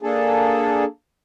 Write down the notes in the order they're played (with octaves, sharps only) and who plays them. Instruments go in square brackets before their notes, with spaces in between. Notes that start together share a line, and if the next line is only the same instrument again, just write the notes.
[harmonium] A#3 D4 G#4 A4